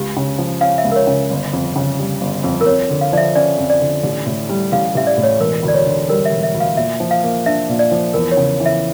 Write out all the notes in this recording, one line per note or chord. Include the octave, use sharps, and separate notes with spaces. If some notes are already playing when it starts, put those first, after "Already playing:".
Already playing: C#2 G4
C#3
F3
C#4 F5
E5
C#2
A#4
C#5
C#3
G1
F2
C#3
G3
G1
F2
A#4
F2 C#5
D3
F5
F3 D5
E5
C#4 D5
F2
D5
D3
A1
A2
G3
A1 F5
A1 E5
D5
A2
C#5
E1 A#4
D2
D5
C#5
D3
G3 A#4
E5
E1
E5
D2
F5
A#2 E5
F3
F5
A#3
D4 E5
A#2
D5
F3
E2 A#4
C#5
C#3
E3
E5